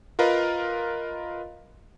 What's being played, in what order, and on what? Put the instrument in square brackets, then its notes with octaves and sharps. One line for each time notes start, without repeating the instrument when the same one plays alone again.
[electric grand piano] F4 A#4 B4 D#5 F5